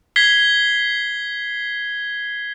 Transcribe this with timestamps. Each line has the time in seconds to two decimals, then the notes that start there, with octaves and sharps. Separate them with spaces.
0.16 G#6 B6 C7 G7